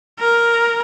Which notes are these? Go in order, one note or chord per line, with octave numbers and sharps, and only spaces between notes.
A#4